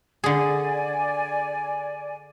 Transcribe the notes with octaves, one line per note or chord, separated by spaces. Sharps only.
D3 G#4 D5 G#5